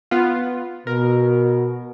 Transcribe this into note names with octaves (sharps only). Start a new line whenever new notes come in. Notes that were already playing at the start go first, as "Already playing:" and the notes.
B3 F4
B2 A#4